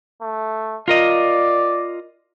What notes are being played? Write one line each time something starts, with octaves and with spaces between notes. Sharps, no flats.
A3
F4 A#4 D5 D#5